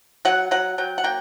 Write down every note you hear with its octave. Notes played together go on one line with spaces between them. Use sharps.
F#3 F#5
F#3 F#5
F#3 G5
F#5
A#3 G5